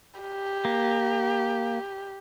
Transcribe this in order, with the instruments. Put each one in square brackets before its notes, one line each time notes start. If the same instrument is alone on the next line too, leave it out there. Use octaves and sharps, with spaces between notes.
[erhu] G4
[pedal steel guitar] A#3